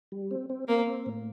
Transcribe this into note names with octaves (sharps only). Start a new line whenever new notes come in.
G3
C4
C4
A#3 C4
C4
A2